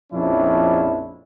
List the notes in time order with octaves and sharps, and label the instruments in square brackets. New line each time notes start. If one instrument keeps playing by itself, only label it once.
[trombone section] A#1 F2 F3 C#4 D4 E4